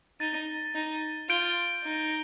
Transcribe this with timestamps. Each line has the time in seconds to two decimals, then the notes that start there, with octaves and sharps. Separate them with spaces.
0.20 D#4 A6 D#7 G7
0.75 D#4
1.29 F4 G6 D7 G7
1.84 D#4